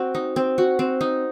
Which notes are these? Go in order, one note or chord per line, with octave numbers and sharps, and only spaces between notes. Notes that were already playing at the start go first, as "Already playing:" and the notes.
Already playing: C4 F#4
D#4
C4
F#4
C4
D#4